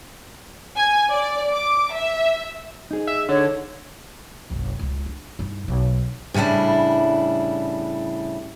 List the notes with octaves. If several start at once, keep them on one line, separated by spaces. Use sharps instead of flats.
G#5
D5
D6
E5
D#4 G#4
E5
D3 C#5
F#1 B1
C#2 F4
D4
G2 D#4
B1
A2 C#3 G3 D4 E4